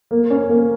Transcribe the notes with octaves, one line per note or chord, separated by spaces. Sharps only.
A#3
C#4
A#3